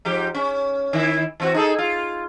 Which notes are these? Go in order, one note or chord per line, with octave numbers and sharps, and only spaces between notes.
G#2 F3 G4
C#4
D#3 E4
E3 C4 F#4
D#4 G#4 A4
F4